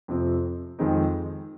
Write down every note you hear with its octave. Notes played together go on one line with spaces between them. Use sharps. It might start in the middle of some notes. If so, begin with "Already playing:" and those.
F2 C3 F3 C4
F2 D#3 G#3 C4 D#4